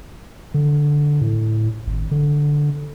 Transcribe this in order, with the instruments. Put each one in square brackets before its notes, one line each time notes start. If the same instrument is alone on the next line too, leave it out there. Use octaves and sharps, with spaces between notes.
[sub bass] D3
A2
G#1
D3